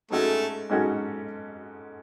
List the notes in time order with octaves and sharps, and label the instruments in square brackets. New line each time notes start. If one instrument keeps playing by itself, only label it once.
[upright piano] G#2 G#3 C#4 F#4 A4 [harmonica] A3
[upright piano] G#2 G#3 C#4 F#4 A4